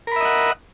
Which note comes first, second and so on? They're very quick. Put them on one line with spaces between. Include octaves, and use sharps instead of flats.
A#4 B5 E5 D#5 F#5